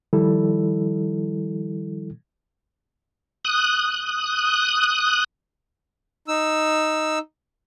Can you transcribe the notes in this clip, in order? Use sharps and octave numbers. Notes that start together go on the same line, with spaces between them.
D#3 F3 G3 E4 A4
D#6 F#6
D#4 E6